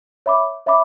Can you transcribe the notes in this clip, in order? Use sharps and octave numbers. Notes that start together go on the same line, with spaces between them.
C#5 E5 B5 D6
C#5 E5 B5 D6